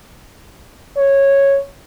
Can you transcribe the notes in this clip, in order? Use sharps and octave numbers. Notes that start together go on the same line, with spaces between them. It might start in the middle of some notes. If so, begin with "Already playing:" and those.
C#5